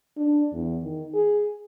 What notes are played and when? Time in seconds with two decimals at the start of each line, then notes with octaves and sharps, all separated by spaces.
0.17 D4
0.53 E2
0.83 D#3
1.14 G#4